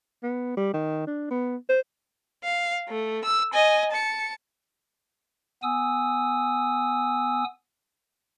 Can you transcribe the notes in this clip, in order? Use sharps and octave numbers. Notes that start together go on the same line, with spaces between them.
B3
G3
D#3
D4
B3
C5
F5
A3
E6
D#5 G#5
A5 C#7
B3 G#5 D#6 E6